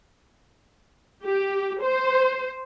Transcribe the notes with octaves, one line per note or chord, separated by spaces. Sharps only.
G4
C5